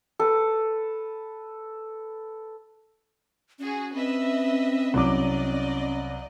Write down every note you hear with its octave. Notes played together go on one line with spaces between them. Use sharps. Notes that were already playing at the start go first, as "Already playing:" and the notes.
A4 B4
C#4 F#4 G#4
C4 B4 D#5 E5
C2 F#3 D5 D#5 D6